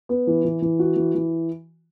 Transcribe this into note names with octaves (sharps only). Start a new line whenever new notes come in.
B3
E3
E3
E3
F#4
E3
E3